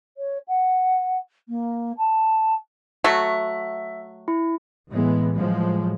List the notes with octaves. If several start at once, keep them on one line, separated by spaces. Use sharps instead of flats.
C#5
F#5
A#3
A5
F#3 A3 F#4 E5
E4
A2 E3 G#3 B3
A2 F3 F#3 G#3